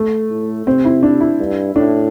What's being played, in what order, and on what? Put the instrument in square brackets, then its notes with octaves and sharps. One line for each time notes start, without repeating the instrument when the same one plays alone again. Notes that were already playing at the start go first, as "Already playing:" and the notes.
Already playing: [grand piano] A3
[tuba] A2
[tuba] C3 [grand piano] C4
[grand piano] E4
D4
E4
[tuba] G2
[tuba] A2 [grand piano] D4